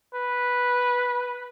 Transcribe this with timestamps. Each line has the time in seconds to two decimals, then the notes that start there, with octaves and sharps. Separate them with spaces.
0.15 B4